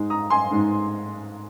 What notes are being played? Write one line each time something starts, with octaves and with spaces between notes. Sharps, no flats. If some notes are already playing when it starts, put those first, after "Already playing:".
Already playing: G#2 G#3 D#4
A#5 D#6
G#5 C6
G#2 G#3 D#4